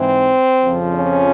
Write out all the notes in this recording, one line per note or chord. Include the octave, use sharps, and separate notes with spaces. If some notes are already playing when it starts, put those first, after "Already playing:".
Already playing: G#2 E3 C4
F2 C#3 F3
C#4